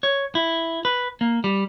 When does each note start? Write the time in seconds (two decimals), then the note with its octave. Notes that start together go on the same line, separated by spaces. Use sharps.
0.03 C#5
0.35 E4
0.85 B4
1.21 A#3
1.44 G3